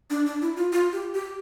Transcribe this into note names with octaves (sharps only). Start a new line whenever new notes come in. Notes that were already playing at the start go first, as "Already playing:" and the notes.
D4
D4
E4
F4
F4
G4
G4